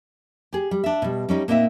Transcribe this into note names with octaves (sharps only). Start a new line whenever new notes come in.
G4 G#4
G3
D4 E5
B2 G3
G3 C#4 D#4
A#2 A#3 C4 D#4 E5